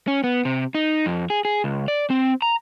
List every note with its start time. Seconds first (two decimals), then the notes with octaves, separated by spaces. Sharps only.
0.08 C#4
0.24 B3
0.45 C3
0.75 D#4
1.06 F2
1.30 G#4
1.45 G#4
1.64 C#2
1.88 D5
2.10 C4
2.42 A#5